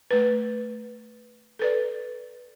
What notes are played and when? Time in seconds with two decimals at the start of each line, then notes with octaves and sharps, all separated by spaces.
0.11 A3 B4
1.59 A4 B4 D5